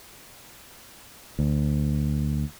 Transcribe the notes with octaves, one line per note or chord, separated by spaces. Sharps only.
D2